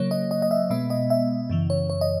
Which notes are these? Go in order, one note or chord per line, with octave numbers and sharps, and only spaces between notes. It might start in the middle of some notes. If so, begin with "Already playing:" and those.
Already playing: C#3 F#3 A#3 C#5
D#5
D#5
D#5
E5
B2 G#3 B3 E5
D#5
E5
F#2 C#3 E3
C#5
C#5
D#5